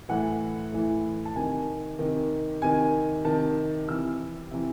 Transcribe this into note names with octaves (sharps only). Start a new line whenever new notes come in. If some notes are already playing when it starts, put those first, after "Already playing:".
A2 E3 F#5
A2 E3
A5
C3 D#3 G#5
C3 D#3
C3 D#3 G#5
C3 D#3 A5
C3 E3 E6
C3 E3